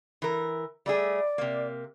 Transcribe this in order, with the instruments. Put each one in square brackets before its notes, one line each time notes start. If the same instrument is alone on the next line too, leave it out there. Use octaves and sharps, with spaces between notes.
[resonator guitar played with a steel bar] E3 A#4
[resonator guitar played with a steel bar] G3 A3 G#4 [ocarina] D5
[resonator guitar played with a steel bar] C3 A#3